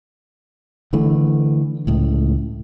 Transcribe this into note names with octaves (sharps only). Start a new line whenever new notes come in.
D3 E3 A3
C#2 A2